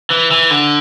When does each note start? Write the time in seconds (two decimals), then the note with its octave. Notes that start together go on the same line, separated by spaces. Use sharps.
0.11 E3
0.31 E3
0.50 D3